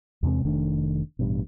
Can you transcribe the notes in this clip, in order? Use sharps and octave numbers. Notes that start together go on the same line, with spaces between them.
E2 C3 G#3 C4
F1 D#3 A3 D4
A1 G2 B2